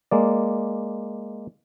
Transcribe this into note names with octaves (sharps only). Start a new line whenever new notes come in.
G#3 A#3 D5